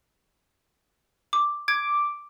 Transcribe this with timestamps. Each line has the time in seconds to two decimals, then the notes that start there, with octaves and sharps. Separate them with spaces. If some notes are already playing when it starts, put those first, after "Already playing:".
1.33 D6
1.68 D6 G#6